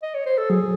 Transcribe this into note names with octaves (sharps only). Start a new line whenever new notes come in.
D#5
C#5
C5
A4
F#3 G#4